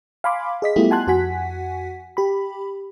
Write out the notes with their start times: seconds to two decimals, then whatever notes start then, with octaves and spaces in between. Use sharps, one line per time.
0.24 F5 G#5 B5 C6 D6
0.62 G#4 D#5 B6
0.76 G3 A3 B3 E4 F4 G4
0.91 F#5 G#5 A5 C6 F#6
1.07 F2 F#4 F#5 G#5 B6
2.17 G4 B5